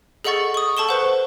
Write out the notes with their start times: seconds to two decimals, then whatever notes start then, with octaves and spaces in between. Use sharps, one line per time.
0.24 G#4 A4 D#5 F#5 C#6 A6
0.54 C#6 D#6
0.77 A4 A5 C#6 E7 G7
0.89 B4 C5 F#5